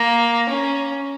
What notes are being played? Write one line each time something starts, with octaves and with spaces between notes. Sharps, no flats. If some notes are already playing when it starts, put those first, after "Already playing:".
Already playing: A#3
C#4